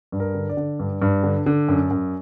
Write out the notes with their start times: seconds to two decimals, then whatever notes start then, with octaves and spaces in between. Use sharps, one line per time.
0.12 G2
0.20 A#4
0.34 D3
0.49 D5
0.57 D3
0.80 G2
1.02 G2
1.24 D3
1.46 D3
1.68 F#2
1.91 F#2